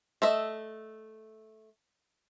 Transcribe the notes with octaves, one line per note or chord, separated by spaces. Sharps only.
A3 D#5 E5